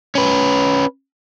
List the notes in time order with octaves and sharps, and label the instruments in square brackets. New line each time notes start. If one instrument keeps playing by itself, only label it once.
[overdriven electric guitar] C#4 B4